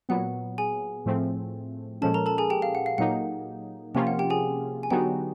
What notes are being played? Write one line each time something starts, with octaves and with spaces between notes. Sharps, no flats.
A#2 F#3 B3 F#5
G#4 G#5
A2 F3 A3 C4
A#2 F3 G#3 C#4 A4 A5
A#4 A#5
A4 A5
G#4 G#5
G4 G5
F5
F#5
F5
A#2 F#3 A#3 D#4 F#5
C3 F3 A#3 C#4 F4 G4 G5
F#5
G4 G5
G#4 G#5
G#5
D3 F#3 B3 D#4 F#4 G4 G5